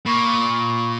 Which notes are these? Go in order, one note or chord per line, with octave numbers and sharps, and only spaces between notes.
A#2 B5 C#6